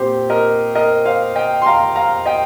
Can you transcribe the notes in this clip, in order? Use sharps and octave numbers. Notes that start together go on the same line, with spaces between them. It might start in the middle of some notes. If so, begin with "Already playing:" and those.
Already playing: A#2 C4 G4 C5
A#4 D#5
A#4 D#5
C5 F5
D#5 G5
C6
F5 A#5
F5 A#5
D#5 G5